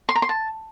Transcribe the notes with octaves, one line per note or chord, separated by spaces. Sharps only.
C6
A#5
C6
A5